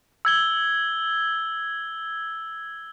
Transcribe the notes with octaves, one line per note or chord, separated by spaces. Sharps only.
E6 G#6 G7